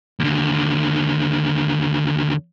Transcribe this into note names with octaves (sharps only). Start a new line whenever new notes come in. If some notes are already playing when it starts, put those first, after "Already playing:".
D#2 D3